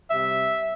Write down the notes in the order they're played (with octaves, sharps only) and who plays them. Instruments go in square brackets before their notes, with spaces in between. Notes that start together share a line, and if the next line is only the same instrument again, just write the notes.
[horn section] C3 G3 E5